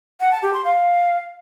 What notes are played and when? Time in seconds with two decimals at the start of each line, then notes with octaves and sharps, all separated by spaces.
0.20 F#5
0.31 A5
0.42 G4
0.54 C6
0.65 F5